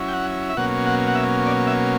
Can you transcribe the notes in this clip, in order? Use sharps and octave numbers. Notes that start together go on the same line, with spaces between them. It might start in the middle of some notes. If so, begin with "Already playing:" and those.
Already playing: F#3 C#4 E4
G5
F#5
E5
B2 F#3 A#3 C#4 F#5
F#5
F#5
E5
D5
E5